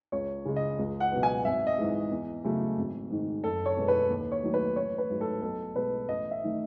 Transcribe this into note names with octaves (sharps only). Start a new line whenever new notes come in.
C#2 C#5
C#3 G#3
D#5
C#2
F#5
B2 F#3 B3
G#5
G#1 E5
D#5
G#2 E3 G#3
E2
C#3 F#3 A3
G#1
G#2 D#3
F#1 A4
C#5
E2 B2 G#3 B3
B4
D#2
C#5
D#3 F#3 A3
B4
A1 C#5
B4
G#2 F#3 A3
A4
B1 A4
B2 G#3 B3 B4
A1 D#5
E5
D#3 A3